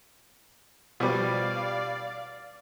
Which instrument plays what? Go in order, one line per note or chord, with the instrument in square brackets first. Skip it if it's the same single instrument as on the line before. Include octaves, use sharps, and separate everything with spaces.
[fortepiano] B2 F3 G3 [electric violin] D5 F5